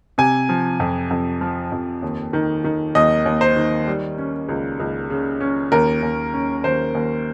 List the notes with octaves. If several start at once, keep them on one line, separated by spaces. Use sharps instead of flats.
C3 G#5
F3
F2
F2
F3
F2
D#2
D#3
D#3
D#2 D#5
D#2
C5
D#3
G3
C#4
C#2
C#2
C#3
C#4
D#2 A#4
D#2
C#4
D#2 C5
D#2